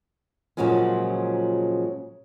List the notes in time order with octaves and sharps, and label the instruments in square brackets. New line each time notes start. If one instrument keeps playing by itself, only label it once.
[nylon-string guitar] A#2 C#3 F3 F#3 G#3 C#4